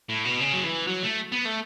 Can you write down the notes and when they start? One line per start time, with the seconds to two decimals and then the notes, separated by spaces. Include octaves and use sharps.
0.09 A2
0.25 B2
0.40 C#3
0.53 F#3
0.64 E3
0.87 F#3
1.03 A3
1.32 B3
1.45 A3